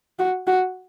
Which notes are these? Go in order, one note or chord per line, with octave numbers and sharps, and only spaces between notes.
F#4
F#4